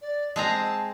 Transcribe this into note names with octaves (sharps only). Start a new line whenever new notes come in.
D5
G#3 C4 A5 A#5